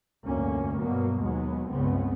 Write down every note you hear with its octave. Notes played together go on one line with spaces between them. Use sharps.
F1 D2 G2 A#3 C#4
G2 B2 F#3 A#3 B3
D#2 F#3 G#3 B3
G1 C#2 C#3 B3 C4